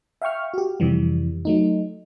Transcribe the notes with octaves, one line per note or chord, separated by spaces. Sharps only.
E5 F5 G5 C#6 F6
F#4 G4
F2 C3 E3 G3
F#3 A3 D#4